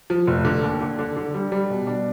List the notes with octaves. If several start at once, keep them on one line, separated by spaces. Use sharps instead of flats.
F3
F1
D3
D#2
D3
D3
D3
G3
G3
B2
D4